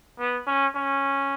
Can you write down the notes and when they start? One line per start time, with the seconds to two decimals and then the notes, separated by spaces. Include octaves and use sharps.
0.19 B3
0.47 C#4
0.75 C#4